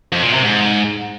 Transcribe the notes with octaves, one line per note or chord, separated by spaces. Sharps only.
F2
A#2
C3
G#2